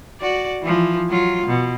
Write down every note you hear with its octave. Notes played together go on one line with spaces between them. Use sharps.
F#4 D5
E3 F3
F#3 F4
B2